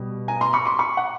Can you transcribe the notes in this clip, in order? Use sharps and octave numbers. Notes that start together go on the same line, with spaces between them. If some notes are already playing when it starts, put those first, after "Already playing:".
Already playing: B2 G3
G#5 A#5
A#5 C6
B5 C#6
C6 D6
B5 C#6
F#5